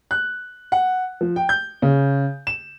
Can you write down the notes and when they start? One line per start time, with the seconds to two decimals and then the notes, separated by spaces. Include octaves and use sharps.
0.11 F#6
0.72 F#5
1.21 F3
1.36 G5
1.49 G6
1.82 C#3
2.47 E7